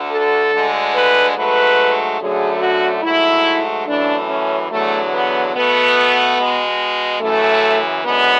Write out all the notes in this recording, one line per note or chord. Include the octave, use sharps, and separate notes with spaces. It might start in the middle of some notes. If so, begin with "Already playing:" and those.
Already playing: D2 D3 A3
A4
D2 D3 G#3
B4
G#2 F#3 A3 B4
F#2 D3 F#3 A3 G#4
F#4
G#2 F#3 A3 E4
F#2 E3 A3 D4
C#4
E2 D3 F#3 A3
B3
B2 A3 B3
B2 G#3
F#2 C#3 E3 A3
F#2 D3 G#3 B3